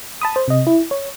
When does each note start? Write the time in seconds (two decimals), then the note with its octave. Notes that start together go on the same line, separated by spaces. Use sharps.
0.21 A5 B5 D#6
0.36 C5
0.48 C3 D#5
0.67 E4
0.91 C#5